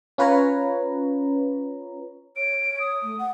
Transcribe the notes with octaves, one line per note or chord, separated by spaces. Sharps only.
C#4 F4 B4 C#5 A#5
C#5 D7
D#6
A3
F#5